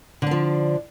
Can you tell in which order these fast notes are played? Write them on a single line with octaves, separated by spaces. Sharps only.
D3 D4 F3